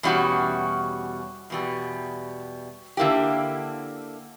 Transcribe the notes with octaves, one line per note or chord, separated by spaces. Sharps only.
E2 B2 G3 C#4 F#4
E2 B2 G3
D3 A#3 E4 G4